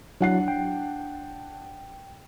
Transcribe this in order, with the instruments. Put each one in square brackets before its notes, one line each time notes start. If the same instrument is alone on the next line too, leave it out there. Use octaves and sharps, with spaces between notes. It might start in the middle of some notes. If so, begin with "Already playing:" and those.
[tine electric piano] F#3 E4 [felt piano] D4 F#5 C7
[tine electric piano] G5